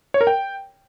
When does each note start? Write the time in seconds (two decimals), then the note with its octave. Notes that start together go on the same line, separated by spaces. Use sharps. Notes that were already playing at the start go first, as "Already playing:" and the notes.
0.14 C#5
0.21 A#4
0.27 G5